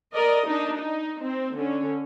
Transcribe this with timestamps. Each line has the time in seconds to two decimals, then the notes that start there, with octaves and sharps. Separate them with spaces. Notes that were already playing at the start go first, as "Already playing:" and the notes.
0.14 A#4 D5 D#5
0.47 D4 D#4
0.76 D#4
1.21 C4
1.56 D3 C#4